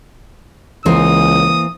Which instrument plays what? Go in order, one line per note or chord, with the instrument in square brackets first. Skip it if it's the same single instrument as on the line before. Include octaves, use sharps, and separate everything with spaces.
[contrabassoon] C#2 [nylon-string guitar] E3 A#3 C5 [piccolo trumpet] D#6